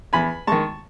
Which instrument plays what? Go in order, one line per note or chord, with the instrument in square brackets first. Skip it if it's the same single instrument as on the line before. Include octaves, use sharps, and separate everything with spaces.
[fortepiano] E2 G#5 B5
D#3 G#3 A5 C#6